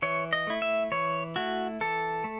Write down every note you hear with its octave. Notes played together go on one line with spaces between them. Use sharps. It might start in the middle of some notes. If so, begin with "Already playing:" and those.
E3 C#5
D#5
A3 E4
E5
E3 C#5
A3 E4 F#4
E3 A4
A3